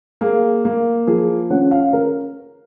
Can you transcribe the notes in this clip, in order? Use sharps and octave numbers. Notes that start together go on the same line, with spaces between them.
A#3 G#4
A#3
F3 G#4
C#4 F#5
F5
A#4